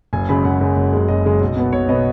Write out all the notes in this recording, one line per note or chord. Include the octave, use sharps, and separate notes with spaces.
F#1 G#5
F#2 C#3 G#3 B5
F#1 F#5
F#2 C#3 G#3
F#1
F#2 C#3 G#3
F#1 D#5
F#2 C#3 G#3
B1
B2 B3
B1 C#5
B2 B3 D#5